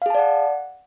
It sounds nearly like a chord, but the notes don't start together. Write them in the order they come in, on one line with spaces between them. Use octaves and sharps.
F5 G#4 A5 D5 F#5